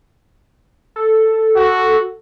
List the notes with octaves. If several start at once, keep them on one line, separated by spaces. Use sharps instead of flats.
A4
F#4